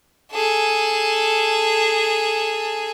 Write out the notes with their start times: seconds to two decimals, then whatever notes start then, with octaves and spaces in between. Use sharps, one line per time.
0.32 G#4 A4